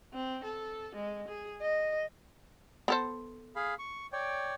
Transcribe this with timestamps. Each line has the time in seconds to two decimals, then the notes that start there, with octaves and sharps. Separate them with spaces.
0.14 C4
0.44 A4
0.96 G#3
1.28 G#4
1.61 D#5
2.88 B3 A4 C5
3.56 G#4 F5 B5
3.79 C#6
4.13 C#5 D5 G5